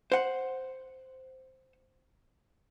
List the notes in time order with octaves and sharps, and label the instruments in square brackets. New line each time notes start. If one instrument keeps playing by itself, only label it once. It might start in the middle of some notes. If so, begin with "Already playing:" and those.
[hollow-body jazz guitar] C5 F#5